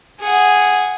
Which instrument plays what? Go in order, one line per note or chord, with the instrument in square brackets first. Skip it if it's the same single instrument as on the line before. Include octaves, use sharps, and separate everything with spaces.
[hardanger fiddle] G#4 F#5